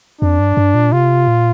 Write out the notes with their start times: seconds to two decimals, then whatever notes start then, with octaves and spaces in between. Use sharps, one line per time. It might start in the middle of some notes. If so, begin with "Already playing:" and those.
0.21 F2 D4
0.39 G2
0.57 G2
0.75 A#2
0.92 C3 F4
1.28 A#2